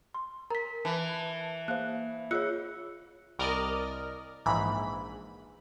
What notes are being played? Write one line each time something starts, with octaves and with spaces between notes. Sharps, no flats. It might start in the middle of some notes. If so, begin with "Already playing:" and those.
C6
A#4 A#5 B6
E3 A5
A#3 C5 F5 F#6
F4 G#4 C#5 E6 F#6 C#7
C2 A#4 D5 D#5 F6
A#1 G#2 E3 B5